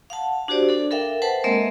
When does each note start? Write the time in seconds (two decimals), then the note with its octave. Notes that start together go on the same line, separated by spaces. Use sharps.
0.10 F5 F#5 A5
0.48 D4 F#4 G4 C5 D5
0.69 D4 A4
0.91 A4 A#4 E5 F5 G5
1.22 A4 B4 C5 F#5 A5
1.44 G#3 A#3 C4 A#4 D#5 E5